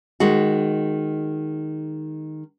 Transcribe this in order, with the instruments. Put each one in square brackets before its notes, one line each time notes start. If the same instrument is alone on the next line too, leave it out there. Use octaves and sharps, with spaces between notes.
[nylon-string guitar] D#3 G#3 F#4